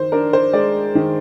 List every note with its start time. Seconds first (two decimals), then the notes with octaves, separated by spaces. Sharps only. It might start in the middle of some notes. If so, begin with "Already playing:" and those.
Already playing: D#3 C5
0.12 D4 A#4
0.33 C5
0.53 G#3 D5
0.95 D#3